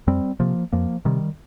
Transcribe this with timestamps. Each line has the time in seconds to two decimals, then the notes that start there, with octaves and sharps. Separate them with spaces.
0.07 F2 G3 C4
0.40 C3 F3 A#3
0.73 F2 F3 A#3
1.05 C3 D#3 G3